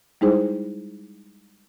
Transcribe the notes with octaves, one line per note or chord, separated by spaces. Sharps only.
G3 G#3 D#4 E4 G#4 C5